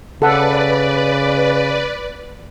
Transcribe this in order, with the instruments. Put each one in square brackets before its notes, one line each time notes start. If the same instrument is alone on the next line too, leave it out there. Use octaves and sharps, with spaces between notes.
[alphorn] C#3 [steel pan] A4 F#5 [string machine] B4 D5